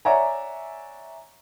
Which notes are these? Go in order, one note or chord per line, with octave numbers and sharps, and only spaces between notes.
C#5 D5 E5 F#5 G#5 A#5